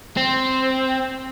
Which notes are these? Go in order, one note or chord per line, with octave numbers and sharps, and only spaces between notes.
C4